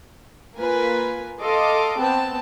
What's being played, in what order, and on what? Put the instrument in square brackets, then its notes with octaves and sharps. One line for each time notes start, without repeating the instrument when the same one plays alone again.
[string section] A#3 F4 A#4 B4 G#5
A4 D#5 F5 C6 D6
B3 C4 G5 A5